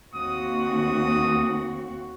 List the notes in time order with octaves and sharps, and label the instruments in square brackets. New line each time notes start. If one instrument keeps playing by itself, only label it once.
[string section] D#2 [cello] C4 F#4 [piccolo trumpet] D#6